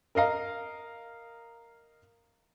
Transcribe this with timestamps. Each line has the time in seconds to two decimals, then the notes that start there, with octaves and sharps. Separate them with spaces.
0.15 A#4 D#5 F5 A#5